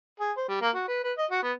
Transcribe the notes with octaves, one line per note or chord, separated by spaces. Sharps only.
G#4
C5
G3
A#3
F#4
B4
B4
D#5
F#4
B3